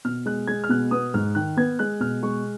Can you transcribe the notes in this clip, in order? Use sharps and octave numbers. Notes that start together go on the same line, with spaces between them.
B2 F6
G#3 F#6
G#3 G#6
F6
B2 F#6
B3 D#6
G#2 F6
D#3 F#6
B3 G#6
G#3 F#6
B2 F6
G#3 C#6